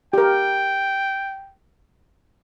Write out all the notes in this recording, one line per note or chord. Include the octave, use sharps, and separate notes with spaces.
G4 A#4 G5